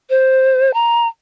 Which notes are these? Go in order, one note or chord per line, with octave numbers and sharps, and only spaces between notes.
C5
A#5